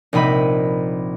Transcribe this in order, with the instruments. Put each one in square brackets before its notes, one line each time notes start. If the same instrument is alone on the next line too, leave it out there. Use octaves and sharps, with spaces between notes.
[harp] A#1 C3 D#4 B5 D#7